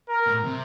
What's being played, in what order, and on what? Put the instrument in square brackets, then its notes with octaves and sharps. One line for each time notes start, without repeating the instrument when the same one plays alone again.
[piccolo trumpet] A#4
[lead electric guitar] A2
C3